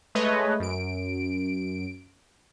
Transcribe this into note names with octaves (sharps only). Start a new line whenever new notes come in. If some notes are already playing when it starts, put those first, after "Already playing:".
G#3 A3 B4 C#5 D#5
F#2 D7